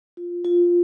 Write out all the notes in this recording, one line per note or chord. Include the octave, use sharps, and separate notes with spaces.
F4
F4